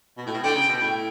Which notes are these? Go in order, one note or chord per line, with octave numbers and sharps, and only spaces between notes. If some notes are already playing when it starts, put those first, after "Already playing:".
B2
A2
B2
D3 G5
C#3
B2
A2